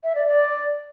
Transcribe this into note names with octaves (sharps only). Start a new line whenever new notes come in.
E5
D5
D5